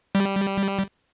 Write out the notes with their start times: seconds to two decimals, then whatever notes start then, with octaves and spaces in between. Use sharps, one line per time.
0.15 G3